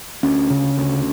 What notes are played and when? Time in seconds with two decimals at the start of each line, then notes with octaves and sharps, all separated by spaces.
0.23 D2 C#4
0.50 C#3
0.77 D2